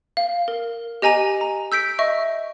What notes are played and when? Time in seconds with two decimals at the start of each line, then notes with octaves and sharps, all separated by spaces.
0.17 F5
0.48 A#4
1.02 G4 D#5 G#5 A#5 D#7
1.41 A#5
1.72 E6 G6 B6 D7
1.99 D#5 E5 C#6